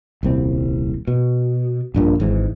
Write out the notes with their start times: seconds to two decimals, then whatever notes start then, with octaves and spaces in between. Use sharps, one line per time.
0.23 D#1 C2 C4
1.07 B2
1.94 A#1 G2 A#2
2.20 G#1 G#2 E3